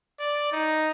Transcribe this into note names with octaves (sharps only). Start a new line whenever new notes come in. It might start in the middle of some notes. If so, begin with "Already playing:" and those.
D5
D#4